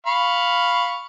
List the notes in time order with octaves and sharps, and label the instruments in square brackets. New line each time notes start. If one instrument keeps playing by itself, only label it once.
[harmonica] F5 B5 C#6